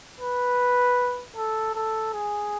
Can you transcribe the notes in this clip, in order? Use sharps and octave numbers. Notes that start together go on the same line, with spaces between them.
B4
A4
A4
G#4